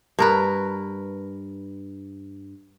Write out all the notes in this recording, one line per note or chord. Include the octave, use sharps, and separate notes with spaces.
G2 A#4 B4